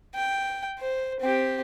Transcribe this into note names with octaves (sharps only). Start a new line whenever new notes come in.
G5
C5
C4 G4